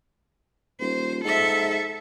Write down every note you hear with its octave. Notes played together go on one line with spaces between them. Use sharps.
D#1 C5
G#2 A4 E5